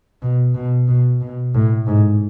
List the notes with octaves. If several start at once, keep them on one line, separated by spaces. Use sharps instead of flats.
B2
B2
B2
B2
A2
G#2